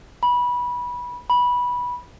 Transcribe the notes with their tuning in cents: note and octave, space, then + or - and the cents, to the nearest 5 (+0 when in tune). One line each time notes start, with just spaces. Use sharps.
B5 -20
B5 -15